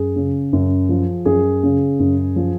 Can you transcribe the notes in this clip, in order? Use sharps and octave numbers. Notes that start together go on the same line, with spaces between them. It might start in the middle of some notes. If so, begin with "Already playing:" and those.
Already playing: F#2 G#4
C#3
F#2
F3
F#2 G#4
C#3
F#2
F3